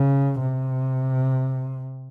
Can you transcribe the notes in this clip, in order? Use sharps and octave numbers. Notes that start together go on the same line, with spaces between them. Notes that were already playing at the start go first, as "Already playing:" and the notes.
Already playing: C#3
C3